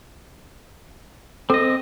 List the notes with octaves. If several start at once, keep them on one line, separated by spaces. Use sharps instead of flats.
C4 A4 D#5